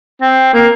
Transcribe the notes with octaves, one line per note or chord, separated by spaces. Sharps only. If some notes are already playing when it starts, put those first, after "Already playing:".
C4
A#3